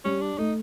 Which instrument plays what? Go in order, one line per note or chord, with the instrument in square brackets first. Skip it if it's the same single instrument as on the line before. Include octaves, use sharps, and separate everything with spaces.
[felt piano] G3 [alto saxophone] C#4
[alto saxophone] D4
[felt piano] A3 [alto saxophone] D#4